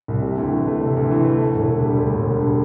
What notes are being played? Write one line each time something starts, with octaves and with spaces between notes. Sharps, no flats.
C2
C3
D2
E3
A3
C3
D2
E3
A3
D2
E1
D3
G3
D2
E1
D3
G3